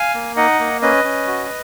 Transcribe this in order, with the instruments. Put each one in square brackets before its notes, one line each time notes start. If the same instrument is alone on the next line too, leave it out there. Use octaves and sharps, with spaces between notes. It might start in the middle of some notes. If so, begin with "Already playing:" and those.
Already playing: [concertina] F5 G#5
A#3
D#4 D#5 F#5
A#3
C#4 B4 D#5
C#4
F#4